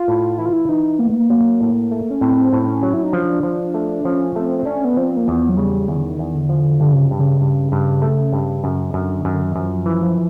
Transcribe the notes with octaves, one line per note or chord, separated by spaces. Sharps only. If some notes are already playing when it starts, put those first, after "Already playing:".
Already playing: F4
A2
E3 E4
F4
E4
E3 D#4
A#3 B3
A3
A#3
F#3 A#3
A2
A3
C#4
A2 C4
A2
C4
C#4
F#3
E4
D#4
F3 D4
F3
A3
F3 C#4
A3 C4
C4
C#4 D4
B3
F3 C4
A#3
E2 B3
F#3
C#3 G3
E2 D#3
D3
D#3
E2
D3
F3
G2 D3
C#3
G2
C#3
G2
G2
A3
G2
F#2 C#3
F#2 D3
F#2 D#3
D3
D#3
F#2 F3
E3
F3